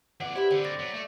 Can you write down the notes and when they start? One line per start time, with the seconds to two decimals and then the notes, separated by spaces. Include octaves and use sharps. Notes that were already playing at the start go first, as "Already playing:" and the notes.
0.20 F2 B4 D5 F#5
0.36 E4 G4 C5 D5 B5
0.51 D3 C4 C5 D5 G5
0.65 D6 A6 A#6
0.79 F#3 B3
0.94 A3